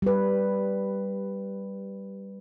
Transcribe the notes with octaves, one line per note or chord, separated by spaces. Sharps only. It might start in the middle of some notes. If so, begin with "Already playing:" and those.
G3 B4